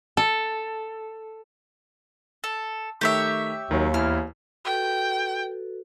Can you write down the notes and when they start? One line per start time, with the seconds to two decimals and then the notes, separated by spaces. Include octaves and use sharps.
0.17 A4
2.44 A4
3.01 D#3 A3 G4 C#5 E5 B6
3.71 D#2 D#3 F#3
3.94 E2 E4 F6
4.65 F#4 A4 B4 G5